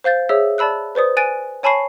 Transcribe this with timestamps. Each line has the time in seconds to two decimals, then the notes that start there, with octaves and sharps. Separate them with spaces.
0.04 C5 F5 G6 A6
0.29 G#4 C#5 E5 E6
0.58 D5 A5 B5 E6 F#6
0.95 B4 C5 D5 D#6
1.17 G#5 F#6 A6 D7 D#7
1.63 C#5 G#5 A5 B5 C#6 C7